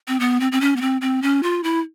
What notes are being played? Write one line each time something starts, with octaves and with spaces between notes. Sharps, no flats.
C4
B3
C4
C4
C#4
B3
C4
C4
C#4
F4
E4